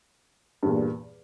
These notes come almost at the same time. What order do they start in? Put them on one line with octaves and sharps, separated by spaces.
G2 E2 A#2